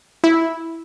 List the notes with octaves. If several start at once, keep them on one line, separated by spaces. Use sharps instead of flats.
E4